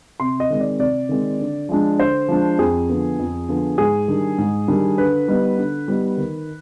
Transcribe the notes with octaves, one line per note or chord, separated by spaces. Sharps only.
C3 C6
D#5
D#3 G#3 C4
D5
C3 D5
D#3 G#3 C4
D3
F3 G#3 D4
D3 C5
F3 G#3 D4
F2 G#4
D3 F3 B3
F2
D3 F3 B3
G#2 G#4
D#3 G3 D4
G#2
D#3 G3 D4
D3 B4
G3 B3 D#4
D3
G3 B3 D#4
D#3